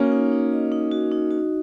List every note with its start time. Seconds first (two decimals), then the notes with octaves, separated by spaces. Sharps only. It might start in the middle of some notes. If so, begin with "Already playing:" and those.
Already playing: A#3 C#4 F#4
0.12 D#4
0.32 D#4
0.52 D#5
0.72 D#4
0.91 F#4
1.12 D#4
1.31 F#4